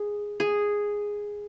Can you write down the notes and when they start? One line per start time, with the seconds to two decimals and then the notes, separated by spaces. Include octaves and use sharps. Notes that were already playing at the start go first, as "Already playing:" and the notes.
Already playing: G#4
0.40 G#4